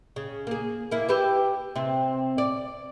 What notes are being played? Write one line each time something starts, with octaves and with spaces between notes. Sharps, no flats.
C#3
A#3 G#4
A#3 E4
G4 B4 E5
C3 C4
D5